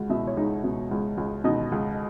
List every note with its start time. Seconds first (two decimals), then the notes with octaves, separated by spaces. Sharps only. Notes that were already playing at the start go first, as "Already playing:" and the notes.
Already playing: C#2 F#4
0.10 B2 E4 E5
0.27 C#5
0.37 C#2 D#4 D#5
0.64 B2
0.91 C#2
1.18 C#2
1.44 B2 D#4 D#5
1.72 C#2